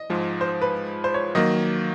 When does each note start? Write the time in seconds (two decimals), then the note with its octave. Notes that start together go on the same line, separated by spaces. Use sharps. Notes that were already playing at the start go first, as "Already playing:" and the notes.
Already playing: D#5
0.10 G#2 F3 G#3
0.41 C5
0.62 B4
1.04 C5
1.14 C#5
1.35 D#3 F#3 A#3 D#5